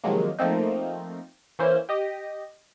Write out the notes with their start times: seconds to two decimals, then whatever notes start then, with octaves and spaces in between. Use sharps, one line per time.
0.04 C3 D#3 F3 F#3 G#3 A#3
0.39 F3 A3 A#3 C4 D#4
1.59 E3 A#3 C#4 E4 C5
1.89 G4 D#5